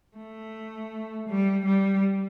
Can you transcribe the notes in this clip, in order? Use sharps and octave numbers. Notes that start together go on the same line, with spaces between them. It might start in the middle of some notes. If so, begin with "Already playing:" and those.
A3
G3
G3